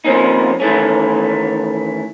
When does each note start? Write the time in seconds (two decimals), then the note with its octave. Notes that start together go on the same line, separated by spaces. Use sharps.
0.04 F3 A#3 C4 C#4 D#4
0.60 D#3 E3 A3 C#4